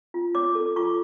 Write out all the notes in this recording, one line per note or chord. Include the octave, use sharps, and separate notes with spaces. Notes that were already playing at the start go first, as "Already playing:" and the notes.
F4
C#5 D6
A4
F4 C#6